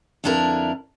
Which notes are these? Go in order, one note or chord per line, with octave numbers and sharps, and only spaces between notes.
F2 D3 D4 E4 A#4 B4